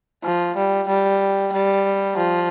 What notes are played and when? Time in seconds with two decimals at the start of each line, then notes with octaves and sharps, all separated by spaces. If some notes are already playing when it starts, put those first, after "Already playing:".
0.24 F3
0.56 G3
0.88 G3
1.53 G3
2.17 F3